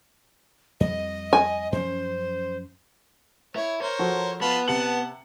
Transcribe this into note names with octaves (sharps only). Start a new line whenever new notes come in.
F2 G3 D#5
G#5
F#2 F3 C#4 C5
E4 C#5
A#4 C5 C#5
F3 F#4 A4
B3 F4 A5 B5
C3 F#5 A5 C#7 F#7